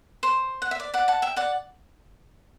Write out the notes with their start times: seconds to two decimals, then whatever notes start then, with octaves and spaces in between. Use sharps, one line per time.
0.23 C5
0.62 F#5
0.71 E5
0.80 D5
0.94 D5 F#5
1.08 F#5 A5
1.22 E5 G5
1.36 D5 F#5